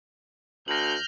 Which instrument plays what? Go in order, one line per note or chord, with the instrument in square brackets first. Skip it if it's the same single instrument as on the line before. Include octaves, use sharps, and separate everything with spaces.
[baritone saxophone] D2 [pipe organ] F6 G6 [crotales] A#6 F#7